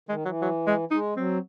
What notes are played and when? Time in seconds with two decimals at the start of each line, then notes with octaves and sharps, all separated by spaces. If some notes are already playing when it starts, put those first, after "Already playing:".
0.09 D#3 G#3
0.25 E3 F#3
0.42 F#3
0.67 G#3
0.91 G#3 D#4
1.16 F#3 C4